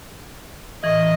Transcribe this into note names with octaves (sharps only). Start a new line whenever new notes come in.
A2 E3 D#5